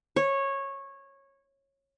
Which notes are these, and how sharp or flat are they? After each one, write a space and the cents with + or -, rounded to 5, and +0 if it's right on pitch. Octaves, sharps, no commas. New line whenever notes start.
C#5 -15